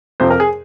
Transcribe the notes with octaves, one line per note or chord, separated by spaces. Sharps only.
F2 C3 F3 C5
A#4
G#4